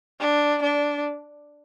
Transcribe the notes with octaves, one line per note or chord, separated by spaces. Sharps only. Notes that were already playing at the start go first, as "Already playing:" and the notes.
D4
D4